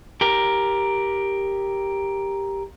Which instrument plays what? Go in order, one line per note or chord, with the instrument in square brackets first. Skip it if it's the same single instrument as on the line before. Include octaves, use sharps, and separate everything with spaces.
[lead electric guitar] G4 A#4